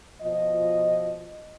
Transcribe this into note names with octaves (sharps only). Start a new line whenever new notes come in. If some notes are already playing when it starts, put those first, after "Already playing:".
B2 F3 F4 D#5